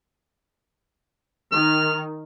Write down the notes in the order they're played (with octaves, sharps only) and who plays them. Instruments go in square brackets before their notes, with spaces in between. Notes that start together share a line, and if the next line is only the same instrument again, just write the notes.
[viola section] D#3 [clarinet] F6